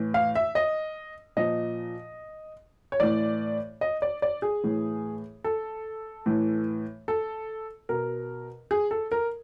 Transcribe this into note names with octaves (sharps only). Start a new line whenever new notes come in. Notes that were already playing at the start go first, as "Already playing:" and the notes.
Already playing: A2 E3
F5
E5
D#5
A#2 F3 D#5
C#5
A2 E3 D5
D#5
D5
D5
G#4
A2 E3
A4
A2 E3
A4
B2 A#4
G#4
A4
A#4